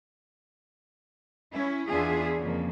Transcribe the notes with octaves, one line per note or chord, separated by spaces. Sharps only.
C#4 E4
E2 B3 D4 F4 G#4 E5
F2 C#3 A#3